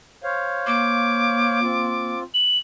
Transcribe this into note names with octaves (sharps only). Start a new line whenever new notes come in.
C5 C#5 F5
A#3 D6
C4 F4
F#7